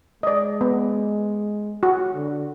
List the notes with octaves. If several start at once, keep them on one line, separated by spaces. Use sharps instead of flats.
G#3 D5 D#5
B3
F#4
D3